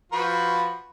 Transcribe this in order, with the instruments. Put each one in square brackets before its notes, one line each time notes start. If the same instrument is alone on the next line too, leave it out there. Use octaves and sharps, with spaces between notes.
[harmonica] F3 F#4 B4